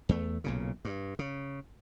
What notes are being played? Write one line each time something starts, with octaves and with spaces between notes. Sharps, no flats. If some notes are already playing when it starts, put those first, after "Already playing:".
E2 A3
B1 A#2 C#3
G2
C#3